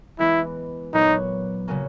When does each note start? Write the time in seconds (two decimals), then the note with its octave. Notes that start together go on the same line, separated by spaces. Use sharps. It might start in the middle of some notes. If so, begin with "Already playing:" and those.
0.19 E3 G#3 B3 E4
0.93 A#2 F#3 B3 D#4 F#4 C#5
1.68 C#3 F#3 A#3 C#4